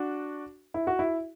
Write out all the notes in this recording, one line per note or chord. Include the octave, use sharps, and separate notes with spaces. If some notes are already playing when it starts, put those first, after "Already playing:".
Already playing: D4 F#4
E4
F#4
E4